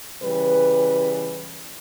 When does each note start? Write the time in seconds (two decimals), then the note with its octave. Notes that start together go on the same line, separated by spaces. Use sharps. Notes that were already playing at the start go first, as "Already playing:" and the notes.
0.23 C#3 E3 G3 B4